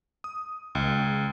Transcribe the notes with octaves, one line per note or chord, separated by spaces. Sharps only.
D#6
C#2